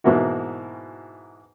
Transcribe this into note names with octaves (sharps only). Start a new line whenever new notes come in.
G#2 B2 E3 A#3 E4 F#4